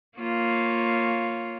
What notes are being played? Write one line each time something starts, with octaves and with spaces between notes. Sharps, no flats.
A#3 F4 C#5